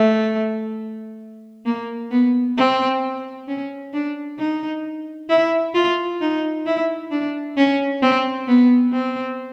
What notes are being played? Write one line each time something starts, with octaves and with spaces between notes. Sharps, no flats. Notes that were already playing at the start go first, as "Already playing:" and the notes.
Already playing: A3
A#3
B3
C4
C#4
D4
D#4
E4
F4
D#4
E4
D4
C#4
C4
B3
C4